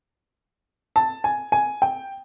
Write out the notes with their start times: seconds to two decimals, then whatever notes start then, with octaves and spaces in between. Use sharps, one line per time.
0.96 A5
1.24 G#5
1.52 G#5
1.82 G5